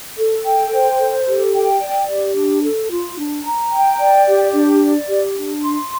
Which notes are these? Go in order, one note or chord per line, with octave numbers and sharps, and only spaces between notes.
A4
G5
C5
A4
G4
G5
D5
G4
D4
A4
F4
D4
A#5
G5
D5
G4
D4
D5
G4
D4
C6